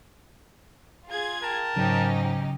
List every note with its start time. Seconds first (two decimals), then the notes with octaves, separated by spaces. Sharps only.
1.07 F4 G#4 G#6
1.42 A#4 G5 A5
1.76 G#2 C#3 F#3 C#4 D#4 G4